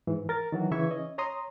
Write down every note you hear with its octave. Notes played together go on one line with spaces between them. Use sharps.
G#2 E3
A#4 A6
D#3 E3 F#3 F#4
C#3 E3 E5 C#6 G#6
C#4 D#5
C#5 A#5 C6 D#6